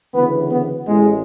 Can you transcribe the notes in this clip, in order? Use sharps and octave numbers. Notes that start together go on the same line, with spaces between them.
D2 C#3 E3 B3
B3
A1 A2 E3 G#3